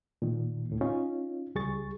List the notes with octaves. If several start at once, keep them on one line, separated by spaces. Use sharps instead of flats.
A#2 D#3
D2 A2
C#4 D#4 F4
C#2 G3 G#4 C#6 A6